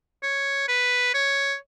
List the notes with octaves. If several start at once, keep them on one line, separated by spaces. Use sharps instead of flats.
C#5
B4
C#5